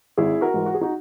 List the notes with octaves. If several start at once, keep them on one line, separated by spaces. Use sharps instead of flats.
G#1 E4 G#4
F#4 A#4
G#2 E3 G#3
F#4
G#4
D#4 F#4